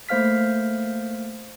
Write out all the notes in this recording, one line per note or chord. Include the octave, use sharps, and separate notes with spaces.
A3 A#3 C5 F5 F6 B6